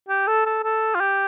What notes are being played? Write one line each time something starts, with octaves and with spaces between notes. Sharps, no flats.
G4
A4
A4
A4
F4
G4